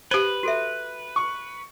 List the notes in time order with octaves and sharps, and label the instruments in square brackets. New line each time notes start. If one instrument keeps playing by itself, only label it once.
[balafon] G4 C5 [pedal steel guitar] B4
[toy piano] F#4 A4 E5
[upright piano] C#6